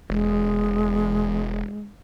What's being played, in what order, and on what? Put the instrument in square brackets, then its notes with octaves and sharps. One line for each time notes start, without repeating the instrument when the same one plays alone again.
[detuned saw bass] E1 [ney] G#3